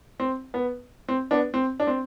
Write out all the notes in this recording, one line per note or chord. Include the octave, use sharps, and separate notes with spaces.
C4
B3
C4
B3 D4
C4
D4
C4